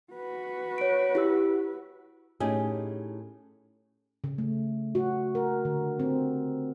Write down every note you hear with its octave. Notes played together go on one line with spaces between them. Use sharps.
F#4 B4
C#5 D7
E4 G4 E6
A2 C#4 D#4 G4 G#4
C#3
A3
F#4
A#4
D3
C4